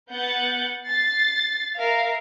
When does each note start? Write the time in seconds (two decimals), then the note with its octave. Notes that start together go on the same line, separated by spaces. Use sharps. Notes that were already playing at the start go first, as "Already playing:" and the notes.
0.11 B3 F#5 G6 A6
0.88 A6 C7
1.78 A#4 E5 F5